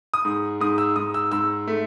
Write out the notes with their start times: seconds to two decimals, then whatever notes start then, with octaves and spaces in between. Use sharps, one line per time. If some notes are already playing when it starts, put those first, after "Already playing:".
0.14 D#6
0.25 G#2
0.60 G#2 D#6
0.78 E6
0.96 G#2 D#6
1.14 E6
1.32 G#2 E6
1.67 A3